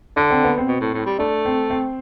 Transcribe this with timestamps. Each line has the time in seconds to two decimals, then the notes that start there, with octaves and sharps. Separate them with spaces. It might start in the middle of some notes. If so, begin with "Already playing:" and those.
0.16 D3 D4
0.31 C4
0.44 B3
0.58 C4
0.68 B2
0.81 A2
0.94 A2
1.06 G3
1.19 A3 D4
1.45 C4
1.70 C4